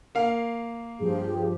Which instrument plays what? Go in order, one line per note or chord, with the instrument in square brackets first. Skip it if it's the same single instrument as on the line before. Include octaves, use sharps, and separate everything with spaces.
[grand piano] A#3 F5
[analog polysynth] G2 F3 G4 [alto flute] G#4